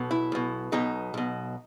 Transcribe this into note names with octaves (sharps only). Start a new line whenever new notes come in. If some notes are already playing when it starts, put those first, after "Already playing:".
Already playing: B1 B2
E4
B1 B2
B1 B2 D#4
B1 B2